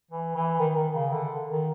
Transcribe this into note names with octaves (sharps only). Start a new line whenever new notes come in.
E3
E3
D#3
D#3
C#3
D3
D#3